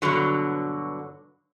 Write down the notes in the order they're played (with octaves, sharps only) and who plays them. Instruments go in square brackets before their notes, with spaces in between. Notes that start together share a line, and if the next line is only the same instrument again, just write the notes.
[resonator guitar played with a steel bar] G2 B2 D3 F#3